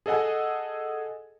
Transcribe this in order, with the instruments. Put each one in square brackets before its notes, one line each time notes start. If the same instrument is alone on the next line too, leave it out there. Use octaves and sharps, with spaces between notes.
[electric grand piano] G#4 A4 D#5 F#5 G#5